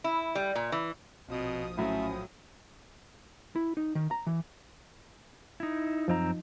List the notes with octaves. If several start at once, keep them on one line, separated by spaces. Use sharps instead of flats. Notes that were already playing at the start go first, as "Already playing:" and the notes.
E4
G3
A#2
E3
A#1 B2 F3 C4 D#6
A2 F#3 A3 C#4
E4
D#4
D#3
A#5
E3
D#4 E4
F#2 F3 C4 D#4 A#5